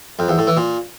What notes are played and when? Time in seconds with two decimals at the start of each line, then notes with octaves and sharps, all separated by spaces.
0.19 F2
0.28 E2
0.38 A2
0.47 E3
0.57 A#2